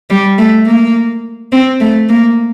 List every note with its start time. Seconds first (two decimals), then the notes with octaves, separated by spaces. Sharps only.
0.10 G3
0.38 A3
0.67 A#3
1.52 C4
1.81 A3
2.10 A#3